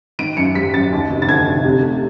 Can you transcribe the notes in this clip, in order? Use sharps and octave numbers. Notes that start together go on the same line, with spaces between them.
D#3 D7
F#2 C#7
G3 B6
F#2 A6
D#2
F1
A6
D3 G#6
F1
C3
A3